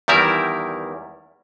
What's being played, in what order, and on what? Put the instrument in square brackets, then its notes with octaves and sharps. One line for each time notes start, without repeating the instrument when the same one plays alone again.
[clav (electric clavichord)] E2 D#3 G3 E4 A#4